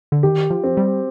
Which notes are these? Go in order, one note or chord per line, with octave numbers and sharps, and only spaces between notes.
D3
D#3 G4
F3
C4
G3